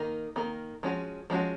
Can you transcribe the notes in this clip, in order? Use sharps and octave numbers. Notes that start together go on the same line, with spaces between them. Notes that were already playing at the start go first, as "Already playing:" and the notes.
Already playing: D#3 A#3 D#4 A#4
D#3 A#3 D#4 A#4
F3 G#3 C#4 F#4
F3 G#3 C#4 F#4